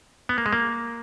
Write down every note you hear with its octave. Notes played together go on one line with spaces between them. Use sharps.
B3
A#3
G#3
A#3